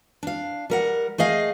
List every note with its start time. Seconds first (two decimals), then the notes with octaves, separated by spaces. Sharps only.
0.23 D4 F5
0.70 G3 A#4 F#5
1.18 A3 G#4 D#5 F5